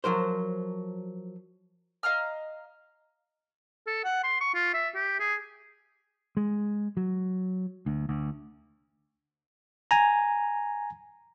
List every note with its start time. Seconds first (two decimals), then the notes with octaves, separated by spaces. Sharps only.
0.04 F3 F#3 A#4 C5
2.03 D#5 F5 A#5 F6
3.87 A4
4.04 F#5
4.24 C6
4.41 C#6
4.55 F4
4.74 E5
4.95 G4
5.20 G#4
6.37 G#3
6.97 F#3
7.86 D2
8.09 D2
9.91 G#5 A#5